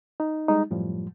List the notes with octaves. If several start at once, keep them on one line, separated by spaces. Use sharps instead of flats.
D#4
G3 G#3 D#4
F#2 A2 F3 G3